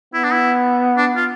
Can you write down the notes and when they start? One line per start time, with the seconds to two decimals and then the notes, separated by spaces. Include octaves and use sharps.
0.14 B3 E4
0.24 D4
0.33 E4
0.97 D4
1.16 F4